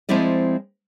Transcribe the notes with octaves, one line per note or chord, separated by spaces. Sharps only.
F3 G#3 C4 E4 D5 D#5